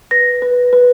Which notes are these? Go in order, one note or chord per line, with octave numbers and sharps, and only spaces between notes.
B4 A#6
B4
B4